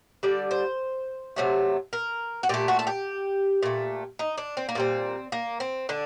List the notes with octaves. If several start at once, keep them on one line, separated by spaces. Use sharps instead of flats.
D3 G3 D5
C5
C3 F#3 A3
A#4
F#4
A#2 A3 G4
F#4
A4
G4
A#2 A3
D#4
D4
C4
A#3
A#2 G3 C4
A#3
C4
D3 D4